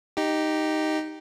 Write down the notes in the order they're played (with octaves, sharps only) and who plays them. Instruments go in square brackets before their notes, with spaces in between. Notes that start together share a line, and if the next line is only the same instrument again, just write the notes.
[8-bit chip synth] D#4 G4